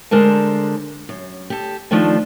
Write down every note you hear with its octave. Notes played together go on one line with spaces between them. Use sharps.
D3 G#3 A#4 C5 A5
F#2
G4 A4
D#3 F3 A3 D4 C5 G5